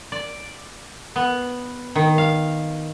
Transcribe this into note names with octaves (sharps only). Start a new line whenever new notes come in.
D5
B3
D#3
F5